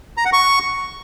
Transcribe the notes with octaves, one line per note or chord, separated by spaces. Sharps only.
A#5
F#5
C#6